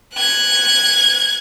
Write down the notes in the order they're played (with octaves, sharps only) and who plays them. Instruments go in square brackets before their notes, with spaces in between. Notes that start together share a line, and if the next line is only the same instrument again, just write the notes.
[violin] F#6 G#6